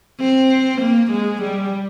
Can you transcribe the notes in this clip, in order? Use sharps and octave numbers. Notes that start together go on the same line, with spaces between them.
C4
A#3
G#3
G3